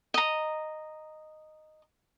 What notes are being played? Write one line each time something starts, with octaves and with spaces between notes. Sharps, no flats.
D#5 A#5